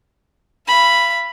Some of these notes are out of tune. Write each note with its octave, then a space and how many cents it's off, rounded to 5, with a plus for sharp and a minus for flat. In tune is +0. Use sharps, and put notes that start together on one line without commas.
F5 -45 B5 +0